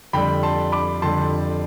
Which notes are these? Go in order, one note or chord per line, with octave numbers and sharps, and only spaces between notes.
F2 D3 G3 G5 B5
A5 C6
B5 D6
F2 D3 G3 A5 C6